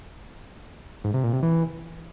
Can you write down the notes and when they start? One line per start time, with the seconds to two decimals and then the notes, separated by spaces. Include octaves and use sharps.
1.04 G#2
1.14 C3
1.23 A#2
1.33 C3
1.43 E3